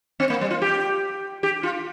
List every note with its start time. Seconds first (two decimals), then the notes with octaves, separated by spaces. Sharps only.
0.20 C4
0.30 A#3
0.41 G3
0.50 F4
0.62 G4
1.43 G4
1.63 F4